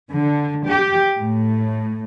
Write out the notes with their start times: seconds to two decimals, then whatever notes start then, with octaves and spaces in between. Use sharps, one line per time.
0.11 D3
0.66 G4
1.17 A2